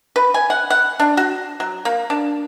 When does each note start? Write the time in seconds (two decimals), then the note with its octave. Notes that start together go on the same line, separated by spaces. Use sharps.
0.16 B4
0.34 G#5
0.50 F#5
0.70 F#5
1.00 D4
1.17 F#4
1.60 F#3
1.85 A#3
2.10 D4